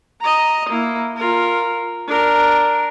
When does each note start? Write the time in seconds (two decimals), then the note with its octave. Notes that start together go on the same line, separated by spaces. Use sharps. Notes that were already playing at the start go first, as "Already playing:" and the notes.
0.21 D#5 A#5
0.69 A#3 E4
1.17 F4 A#4
2.07 D4 A#4